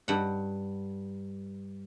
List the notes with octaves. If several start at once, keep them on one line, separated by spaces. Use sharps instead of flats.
G2 F#5